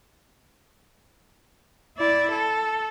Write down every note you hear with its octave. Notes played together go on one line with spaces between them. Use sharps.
E4 D5
A4